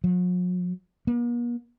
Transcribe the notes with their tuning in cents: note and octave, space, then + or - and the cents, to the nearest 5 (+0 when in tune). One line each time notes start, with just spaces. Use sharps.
F#3 -45
A#3 +45